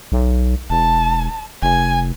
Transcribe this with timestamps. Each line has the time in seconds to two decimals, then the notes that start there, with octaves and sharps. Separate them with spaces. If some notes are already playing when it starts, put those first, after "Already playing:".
0.12 B1
0.70 E1 A5
1.62 F1 G#5